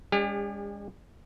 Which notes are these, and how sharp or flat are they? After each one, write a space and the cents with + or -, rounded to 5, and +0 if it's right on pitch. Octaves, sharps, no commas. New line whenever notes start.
G#3 -40 C#4 +40 G4 +40